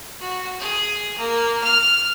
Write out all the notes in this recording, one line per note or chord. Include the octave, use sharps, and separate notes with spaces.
F#4
G#4
A#3
F6